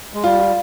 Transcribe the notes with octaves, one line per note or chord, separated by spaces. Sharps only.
G#3
G3 F4
F4